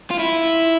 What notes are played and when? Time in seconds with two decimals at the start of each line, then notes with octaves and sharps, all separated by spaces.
0.11 F4
0.19 E4